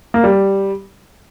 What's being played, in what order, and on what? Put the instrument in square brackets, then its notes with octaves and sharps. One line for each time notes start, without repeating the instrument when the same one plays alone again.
[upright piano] A#3
G3